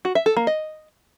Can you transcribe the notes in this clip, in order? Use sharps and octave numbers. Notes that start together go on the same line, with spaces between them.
F#4
E5
A4
A#3
D#5